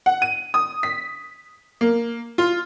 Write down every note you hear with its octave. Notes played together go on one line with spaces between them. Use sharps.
F#5
D#7
D#6
B6
A#3
F4